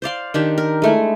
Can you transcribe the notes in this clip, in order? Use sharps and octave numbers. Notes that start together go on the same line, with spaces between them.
C5 D5 F5 C6
D#3 D4 G4
A#4
G#3 A3 E4